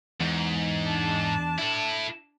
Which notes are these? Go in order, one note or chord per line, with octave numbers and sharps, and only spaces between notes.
E2 G#2
D4 A5
E4 A4